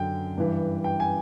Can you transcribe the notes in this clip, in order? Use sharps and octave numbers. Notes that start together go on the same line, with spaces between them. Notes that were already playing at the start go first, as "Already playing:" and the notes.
Already playing: F#2 D3 G5
G2 E3
G5
G#5